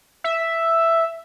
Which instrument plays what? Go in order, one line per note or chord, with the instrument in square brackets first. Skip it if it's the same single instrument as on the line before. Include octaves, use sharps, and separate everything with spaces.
[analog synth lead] E5